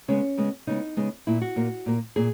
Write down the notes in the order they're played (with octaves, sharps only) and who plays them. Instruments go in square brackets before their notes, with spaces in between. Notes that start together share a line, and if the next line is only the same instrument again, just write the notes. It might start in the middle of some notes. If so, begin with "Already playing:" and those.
[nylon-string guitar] C#3 G#3 B3 C#4
C#3 G#3 B3
C#3 G#3 B3 D#4
C#3 G#3 B3
A#2 A#3 E4
F#4
A#2 A#3
A#2 A#3
A#2 A#3 G#4